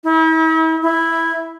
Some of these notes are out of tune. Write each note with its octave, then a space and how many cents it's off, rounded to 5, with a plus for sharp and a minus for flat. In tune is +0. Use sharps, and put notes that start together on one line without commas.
E4 -45
E4 -5